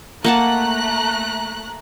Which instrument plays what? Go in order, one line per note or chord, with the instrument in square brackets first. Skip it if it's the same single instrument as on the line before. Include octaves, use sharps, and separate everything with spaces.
[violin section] A3 A#5 F#6 [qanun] A#3 F#5 A5